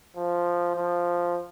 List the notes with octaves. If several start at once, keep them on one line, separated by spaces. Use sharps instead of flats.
F3
F3